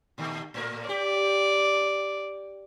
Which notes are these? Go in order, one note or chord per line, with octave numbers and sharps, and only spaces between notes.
A#2 D#3 A3
A2 A3 A#4
G4 D5